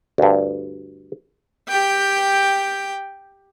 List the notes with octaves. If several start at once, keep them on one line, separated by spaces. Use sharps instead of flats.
D2 G2
G4 G5